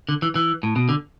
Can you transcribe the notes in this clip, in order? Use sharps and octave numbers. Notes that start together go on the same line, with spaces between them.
D3
E3
E3
A2
B2
D3